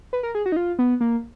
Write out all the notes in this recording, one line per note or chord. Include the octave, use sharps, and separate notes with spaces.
B4
A#4
G#4
F#4
D#4
F4
B3
A#3